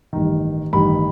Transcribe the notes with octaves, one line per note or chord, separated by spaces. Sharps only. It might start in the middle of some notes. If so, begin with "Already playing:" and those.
A1 G2 D#3
A1 G2 D#3 B5